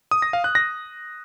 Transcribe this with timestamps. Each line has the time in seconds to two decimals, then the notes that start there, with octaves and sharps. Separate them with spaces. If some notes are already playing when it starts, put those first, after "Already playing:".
0.11 D#6
0.22 A#6
0.33 F5
0.44 F#6
0.55 A#6